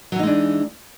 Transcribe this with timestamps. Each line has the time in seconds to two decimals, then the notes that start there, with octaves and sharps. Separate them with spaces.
0.12 F#3
0.16 E3
0.19 D#4
0.23 G#3
0.27 D4